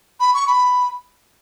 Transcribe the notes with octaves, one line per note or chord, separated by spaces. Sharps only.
B5
C#6
B5